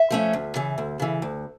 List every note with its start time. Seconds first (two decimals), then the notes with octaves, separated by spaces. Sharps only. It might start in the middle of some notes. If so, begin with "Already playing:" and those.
Already playing: E5
0.10 F3 A3 C#4
0.33 D2
0.55 C#3 E3
0.78 D2
1.00 C#3 E3
1.22 D2